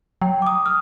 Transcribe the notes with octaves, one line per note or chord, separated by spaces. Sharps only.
F#3 G5
D6 D#6
D#6 F6